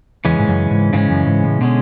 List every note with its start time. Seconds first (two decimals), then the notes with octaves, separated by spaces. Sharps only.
0.25 E2 C#3 E3 G#3 C#4
0.39 G#2
0.48 F#2
0.70 G#2
0.93 G#2 C#3 E3 G#3 C#4
1.10 F#2
1.27 G#2
1.44 A2
1.61 B2 D3 G#3 C#4